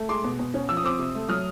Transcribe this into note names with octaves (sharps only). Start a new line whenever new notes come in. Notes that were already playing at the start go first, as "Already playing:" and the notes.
Already playing: A3
G#3 C6 D6
B2
B2
C#4
F3 E6
D#6
C4 D6 E6
C3
A3
F#3 D#6 F6